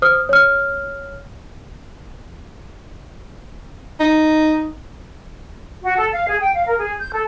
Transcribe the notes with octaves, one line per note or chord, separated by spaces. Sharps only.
C5 D#6 F6
C#5 F6
D#4
F#4
A4
F5
G#4
G5
F5
A#4
G#4
G6
A4